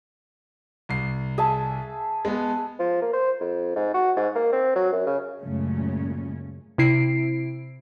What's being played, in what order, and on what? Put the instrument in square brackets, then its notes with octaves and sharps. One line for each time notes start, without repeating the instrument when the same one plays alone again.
[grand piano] C2 C7
[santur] G#4 E5 A5
[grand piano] G#3 B3
[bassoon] F3
A#3
C5
F2
G#2
F#4
G#2
A#3
C4
F#3
F#2
C#3
[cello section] F#2 A#2 C#3 G#3 A3 C#4
[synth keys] C3 E4 C7 D7